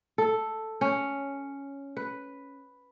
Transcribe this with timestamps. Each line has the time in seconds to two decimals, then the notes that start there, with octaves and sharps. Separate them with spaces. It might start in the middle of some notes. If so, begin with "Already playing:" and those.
0.18 A4
0.81 C#4
1.97 B4